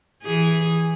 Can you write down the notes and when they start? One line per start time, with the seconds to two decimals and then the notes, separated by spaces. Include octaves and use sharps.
0.23 E3 G#4